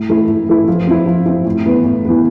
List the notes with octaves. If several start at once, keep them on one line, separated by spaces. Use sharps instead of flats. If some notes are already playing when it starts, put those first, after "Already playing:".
Already playing: A2
E3 A3 E4
A2
E3 A3 E4
F3
C4 E4
F3
C4 E4
A2
E3 B3
A2
E3 B3